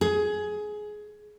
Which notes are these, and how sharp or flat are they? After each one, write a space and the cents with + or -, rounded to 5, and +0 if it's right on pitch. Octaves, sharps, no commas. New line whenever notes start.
G#4 +15